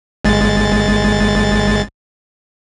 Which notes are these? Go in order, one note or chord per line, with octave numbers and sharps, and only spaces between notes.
G1 G#3 A6